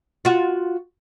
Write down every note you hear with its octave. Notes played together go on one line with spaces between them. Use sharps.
F4 F#4